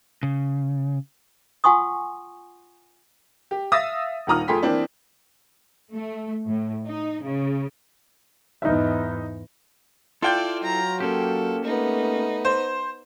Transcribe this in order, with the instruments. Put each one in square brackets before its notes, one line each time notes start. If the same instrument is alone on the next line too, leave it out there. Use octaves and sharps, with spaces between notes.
[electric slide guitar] C#3
[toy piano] F4 F#5 G#5 C6 C#6 D#6
[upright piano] G4
E5 F5 D#6 E6 A6 A#6
D#1 D#3 F4 A#5 D#6 F6
F2 A3 G#4 G5 C6 B6
E3 A#3 C4 D4
[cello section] A3
A2
D#4
C#3
[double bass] E2 G#2 [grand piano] D#4 E5
[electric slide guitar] E4 A4 [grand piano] F4 G5 G6 [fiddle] D5
[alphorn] F#3 [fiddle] A#5
[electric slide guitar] A#3 C#4 G4 [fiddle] A4
[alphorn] A3 [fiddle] B3 D#4
[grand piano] C5